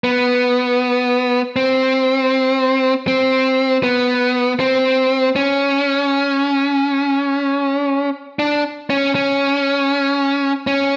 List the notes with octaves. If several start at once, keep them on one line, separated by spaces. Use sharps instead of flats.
B3
C4
C4
B3
C4
C#4
D4
C#4
C#4
C#4